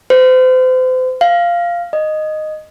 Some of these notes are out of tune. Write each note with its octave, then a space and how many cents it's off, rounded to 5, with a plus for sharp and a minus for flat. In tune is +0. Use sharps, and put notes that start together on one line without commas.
C5 -35
F5 -10
D#5 -10